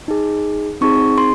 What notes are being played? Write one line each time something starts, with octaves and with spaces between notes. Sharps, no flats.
D#4 G#4
C4 D#4 G#4 C#6
C6